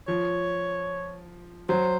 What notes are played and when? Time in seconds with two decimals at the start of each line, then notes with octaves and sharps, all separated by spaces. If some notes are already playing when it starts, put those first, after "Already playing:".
0.08 F3 C#5
1.69 F#3 C5